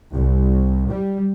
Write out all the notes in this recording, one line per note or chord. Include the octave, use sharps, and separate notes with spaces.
C2
G3